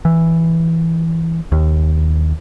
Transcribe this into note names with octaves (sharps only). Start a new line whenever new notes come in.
E3
D#2